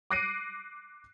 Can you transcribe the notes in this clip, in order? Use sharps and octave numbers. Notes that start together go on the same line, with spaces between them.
D6 F#6 A#6 C7 D7 D#7